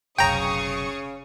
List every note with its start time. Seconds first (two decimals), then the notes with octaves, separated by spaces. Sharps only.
0.18 F1 B1 C#3 F5 G5 A#5 C#6 D#6